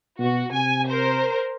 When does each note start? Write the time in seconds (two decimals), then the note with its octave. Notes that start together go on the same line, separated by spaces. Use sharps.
0.19 B2 F#4
0.52 C3 G#5
0.89 A#4 C5